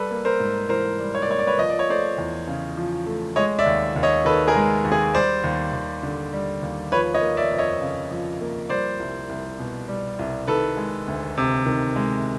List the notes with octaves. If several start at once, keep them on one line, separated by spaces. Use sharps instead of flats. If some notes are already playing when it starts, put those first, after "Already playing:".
Already playing: G3 A4 B4
A#3
A#4 C5
G#2
E3 A#4 C5
G3
C#5
D5
A#3 C#5
D5
B4 C#5
F3 D#5
D5
C#5
A3 C5 D5
E2
C#3
F3
A3
G#3 C#5 D#5
D5 E5
D#2
D#2
C#5 D#5
D#3 A4 B4
G#4 A#4
G#3
D#2
G#4
G3 C5 D5
D#2
D#2
D3
G3
D#2
F3 B4 C#5
C#5 D#5
A#3
D5 E5
F2
C#5 D#5
C#3
F3
A#3
G3 C5 D5
C2
C2
B2
G3
C2
D#3 A4 B4
G#3
D2
C3
D#3
G#3